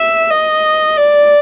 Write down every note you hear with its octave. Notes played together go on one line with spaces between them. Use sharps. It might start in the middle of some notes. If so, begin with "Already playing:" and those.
Already playing: E5
D#5
D5